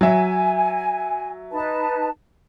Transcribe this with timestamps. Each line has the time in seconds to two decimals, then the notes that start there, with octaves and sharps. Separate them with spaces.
0.01 F#3 E5 G#5
1.51 D#4 B4 A5